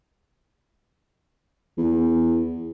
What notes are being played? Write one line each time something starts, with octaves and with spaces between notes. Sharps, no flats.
E2